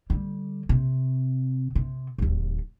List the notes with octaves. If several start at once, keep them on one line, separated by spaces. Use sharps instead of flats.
D3 G3
C3
C3
D1 D#2